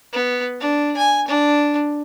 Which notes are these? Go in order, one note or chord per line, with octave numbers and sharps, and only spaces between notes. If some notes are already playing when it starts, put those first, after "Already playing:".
B3
D4
G#5
D4